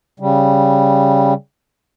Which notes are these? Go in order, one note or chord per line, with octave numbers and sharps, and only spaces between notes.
C#3 G3